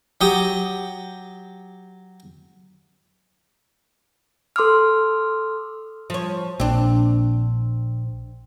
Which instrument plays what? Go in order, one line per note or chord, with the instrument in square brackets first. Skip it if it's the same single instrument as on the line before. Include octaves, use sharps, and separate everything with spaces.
[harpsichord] F#3 G4 D#6
[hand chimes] A4 C6 D6 E6 F6
[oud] F3 C#5
[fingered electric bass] A#1 [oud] C4 D4